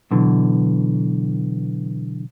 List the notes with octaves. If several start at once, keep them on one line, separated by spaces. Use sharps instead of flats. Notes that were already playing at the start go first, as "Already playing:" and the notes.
B2 D3 E3 F#3